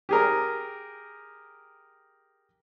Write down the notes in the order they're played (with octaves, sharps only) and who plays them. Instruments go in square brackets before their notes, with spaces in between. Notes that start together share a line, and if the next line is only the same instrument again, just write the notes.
[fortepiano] G4 G#4 A#4